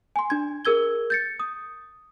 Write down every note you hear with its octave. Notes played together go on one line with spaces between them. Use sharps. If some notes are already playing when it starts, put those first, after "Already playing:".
G#5 C6
D4 G#6
G#4 A#4 E6 G#6 G7
G6 A6 C#7
D#6